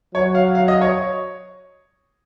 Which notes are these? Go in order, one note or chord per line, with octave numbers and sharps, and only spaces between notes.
F#3 C#5
F5
F5
D#5
C#5